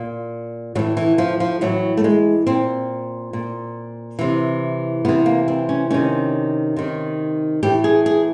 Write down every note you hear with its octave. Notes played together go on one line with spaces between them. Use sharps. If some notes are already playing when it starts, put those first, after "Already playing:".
Already playing: A#2
A2 E3 F#3
E3
F3
F3
A2 E3 F#3
A3
G#3
A#2 C4
A#2
C3 E3
C3 E3 B3
A#3
C4
C#4
C3 D#3 C#4
C3 D#3
A2 E3 G4
G#4
G#4